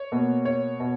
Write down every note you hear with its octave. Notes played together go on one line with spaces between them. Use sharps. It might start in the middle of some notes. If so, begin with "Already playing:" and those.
Already playing: C#5
B2 A#3
C#5
B2